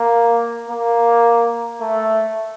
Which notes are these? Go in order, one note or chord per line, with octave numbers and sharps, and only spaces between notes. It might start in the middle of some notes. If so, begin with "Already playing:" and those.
Already playing: A#3
A#3
A3